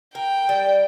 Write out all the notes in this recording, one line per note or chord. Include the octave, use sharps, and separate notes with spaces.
A#4 G5
G3